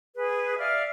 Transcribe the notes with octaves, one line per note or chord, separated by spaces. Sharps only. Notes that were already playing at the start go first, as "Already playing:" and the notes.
G#4 B4
D5 E5 F5 F6